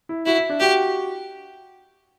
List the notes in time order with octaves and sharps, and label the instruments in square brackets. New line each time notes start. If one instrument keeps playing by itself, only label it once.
[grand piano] E4
[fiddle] E4 [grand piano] F#4
[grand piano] E4
D4
[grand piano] F#4 [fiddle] G4